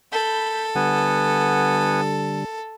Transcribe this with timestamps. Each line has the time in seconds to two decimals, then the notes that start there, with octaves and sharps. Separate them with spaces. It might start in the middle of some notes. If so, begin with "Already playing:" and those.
0.13 A4 B5 G6
0.75 D3 G3 B3 F#5 G#5